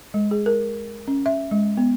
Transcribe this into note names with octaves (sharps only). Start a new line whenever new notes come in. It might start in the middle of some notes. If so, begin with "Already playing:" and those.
G#3
G#4
A#4
C#4
E5
G#3
B3